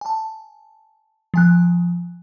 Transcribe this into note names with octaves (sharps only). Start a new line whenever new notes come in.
G#5 A5
F3 G#5 F#6